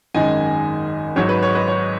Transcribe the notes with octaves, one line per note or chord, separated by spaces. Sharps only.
G#1 F#2 D#3 G#3 D#5 G#5
G#1 G#2 F#3 C#5
B4
C#5
B4 D#5
C#5